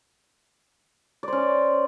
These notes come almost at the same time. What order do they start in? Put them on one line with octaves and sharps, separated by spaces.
D5 C5 C#4